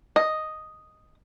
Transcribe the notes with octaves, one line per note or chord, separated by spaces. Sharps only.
D#5